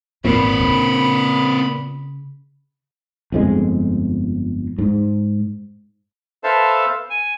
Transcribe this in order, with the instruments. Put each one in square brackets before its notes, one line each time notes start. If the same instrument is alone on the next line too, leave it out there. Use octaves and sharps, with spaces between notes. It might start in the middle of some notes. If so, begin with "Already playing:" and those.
[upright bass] G#1 E2 [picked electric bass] A#2 [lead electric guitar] C4 B4 [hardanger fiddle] B5
[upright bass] C#3
[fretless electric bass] G1 F2 G#3
G#2
[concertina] A4 B4 C5 E5 F5 A5
G#5